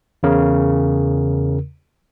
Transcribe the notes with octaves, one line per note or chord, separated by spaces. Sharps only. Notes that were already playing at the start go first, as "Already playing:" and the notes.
E2 C#3 A#4